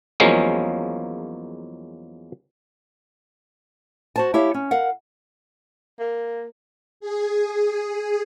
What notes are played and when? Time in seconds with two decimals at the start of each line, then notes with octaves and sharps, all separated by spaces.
0.20 E2 F3 F#3 G#3 A#3 C#4
4.16 F#4 C5 A5
4.34 E4 G4 C#5 F5
4.54 C#4
4.71 A#4 F5 F#5
5.99 A#3
7.00 G#4